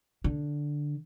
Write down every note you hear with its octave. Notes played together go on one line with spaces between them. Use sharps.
D3